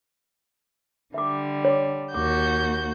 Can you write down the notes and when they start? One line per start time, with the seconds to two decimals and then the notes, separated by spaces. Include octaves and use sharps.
1.14 D3 G3 E5 D6
1.65 C#5 D6
2.14 D#2 F#4 D6 G6